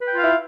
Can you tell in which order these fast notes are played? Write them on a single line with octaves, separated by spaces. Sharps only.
B4 G5 F4 F5 E4